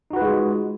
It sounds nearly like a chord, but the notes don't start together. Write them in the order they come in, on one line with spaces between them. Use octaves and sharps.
D#4 F#4 B4 F4 G#3